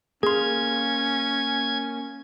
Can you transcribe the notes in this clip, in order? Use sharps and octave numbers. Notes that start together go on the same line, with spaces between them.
A#3 C#4 G#4 F5 C6 G#6